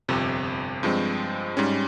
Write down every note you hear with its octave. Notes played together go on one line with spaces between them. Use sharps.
G1 F2 C3
G2 F3 G#3 C4
G#2 G3 C#4